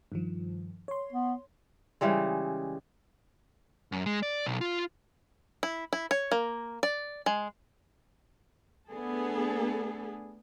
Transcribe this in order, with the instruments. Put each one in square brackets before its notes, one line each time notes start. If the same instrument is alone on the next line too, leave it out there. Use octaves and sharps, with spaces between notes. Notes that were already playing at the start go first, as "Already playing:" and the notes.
[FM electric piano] G2 D#3 F3
C#5 C6
[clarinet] B3
[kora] C#3 E3 G3 G#3
[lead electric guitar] F#2
G#3
D5
B1
F4
[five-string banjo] E4
E4
C#5
A#3
D5
G#3
[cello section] A3 B3 D4 G#4 A4